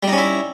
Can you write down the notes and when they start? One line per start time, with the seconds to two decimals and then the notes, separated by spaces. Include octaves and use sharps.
0.03 G3
0.08 D#4
0.12 C#4
0.17 E4